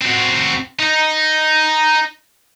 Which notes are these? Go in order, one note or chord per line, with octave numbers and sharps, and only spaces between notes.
C4 F#4
D#4